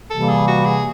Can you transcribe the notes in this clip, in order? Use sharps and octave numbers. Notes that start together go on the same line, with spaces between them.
C3 E3 G3 A#3 A4
G#4
F#4
G#4